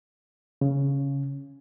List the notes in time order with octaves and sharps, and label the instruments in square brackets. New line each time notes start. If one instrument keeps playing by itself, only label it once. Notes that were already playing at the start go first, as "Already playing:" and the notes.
[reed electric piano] C#3